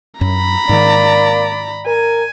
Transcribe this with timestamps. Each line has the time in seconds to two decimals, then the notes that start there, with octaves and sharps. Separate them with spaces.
0.21 F#2 A#5 B5
0.69 G#2 D#3 A#3 D5
1.86 A#4 G#5